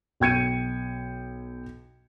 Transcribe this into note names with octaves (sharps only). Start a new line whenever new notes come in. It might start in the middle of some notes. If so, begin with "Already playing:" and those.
B1 G5 G#6 C#7 D#7